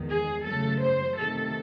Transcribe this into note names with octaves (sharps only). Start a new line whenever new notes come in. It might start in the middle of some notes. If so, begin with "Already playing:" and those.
Already playing: E2 D#3 G#3
G#4
F#2 C#3 F#3 A3 A4
C5
C3 D#3 A3 A4